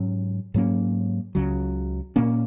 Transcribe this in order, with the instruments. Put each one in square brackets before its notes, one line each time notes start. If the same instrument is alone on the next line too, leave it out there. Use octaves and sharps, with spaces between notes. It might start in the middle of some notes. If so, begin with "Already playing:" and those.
Already playing: [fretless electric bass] G#2 F#3 C#4
G#2 F#3 A#3 C#4
C#2 C#3 F#3
A#2 A#3 C#4